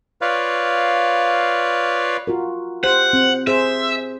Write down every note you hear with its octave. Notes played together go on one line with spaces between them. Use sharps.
F4 B4 C#5 D5 F5
F4 F#4 A#4
G4 C5 F#5
C4
G#4 C5 E5